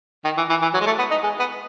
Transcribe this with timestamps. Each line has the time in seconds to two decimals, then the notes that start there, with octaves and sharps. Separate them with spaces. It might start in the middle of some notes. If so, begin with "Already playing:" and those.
0.24 D#3
0.37 E3
0.50 E3
0.62 E3
0.74 F#3
0.80 G#3
0.86 A3
0.99 B3
1.11 D#4
1.23 G#3
1.39 B3